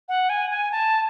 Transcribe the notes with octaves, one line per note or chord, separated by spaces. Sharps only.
F#5
G#5
G#5
A5